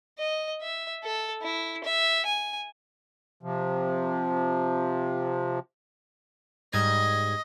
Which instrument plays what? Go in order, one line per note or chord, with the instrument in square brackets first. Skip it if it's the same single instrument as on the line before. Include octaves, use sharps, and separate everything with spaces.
[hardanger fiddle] D#5
E5
A4
E4
E5
G#5
[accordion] C3 F3
[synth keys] G#2 G3 G#6 [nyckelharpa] D#5